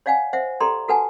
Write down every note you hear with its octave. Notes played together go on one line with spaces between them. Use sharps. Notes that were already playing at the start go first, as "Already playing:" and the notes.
C#5 D5 F5 F#5 G#5
C5 E5 F#5
G4 A4 D5 A#5 C6
F#4 A4 B4 F#5 G#5 A5